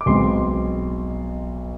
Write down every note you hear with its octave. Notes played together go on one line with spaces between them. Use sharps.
D6
B1 B2 G#3 C4 C6
C6